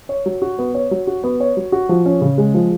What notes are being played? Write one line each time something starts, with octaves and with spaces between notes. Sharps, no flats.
C#5
F#3
F#4
B3
C#5
F#3
F#4
B3
C#5
F#3
F#4
F3
C#4
C#3
G#3
F3